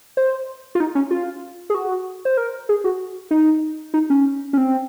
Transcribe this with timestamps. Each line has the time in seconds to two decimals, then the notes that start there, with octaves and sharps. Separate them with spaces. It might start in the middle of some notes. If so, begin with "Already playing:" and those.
0.17 C5
0.75 F4
0.80 D#4
0.95 C#4
1.11 F4
1.70 G#4
1.75 F#4
2.25 C5
2.37 A#4
2.69 G#4
2.84 F#4
3.31 D#4
3.94 D#4
4.10 C#4
4.53 C#4
4.58 C4